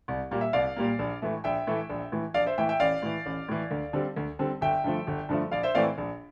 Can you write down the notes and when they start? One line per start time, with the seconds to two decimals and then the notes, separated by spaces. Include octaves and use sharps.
0.08 C2
0.31 A#2 G3 A#3
0.41 E5
0.53 C2 D5 F5
0.76 A#2 G3 A#3
0.99 A#1
1.22 A2 E3 A3
1.44 A#1 E5 G5
1.67 A2 E3 A3
1.90 A#1
2.12 A2 E3
2.34 A#1 D5 F5
2.46 C5 E5
2.58 A2 E3 E5 G5
2.69 E5 G5
2.80 A1 D5 F5
3.02 A2 E3
3.26 A1
3.48 A2 E3
3.71 D2
3.93 D3 G3 C4
4.16 D2
4.39 D3 G3 C4
4.61 G1 E5 G5
4.84 G2 D3 F3 A3
5.07 G1
5.29 G2 D3 F3 A3
5.51 A#1 D5 F5
5.63 C5 E5
5.74 A2 E3 A3 C4 D5 F5
5.98 A#1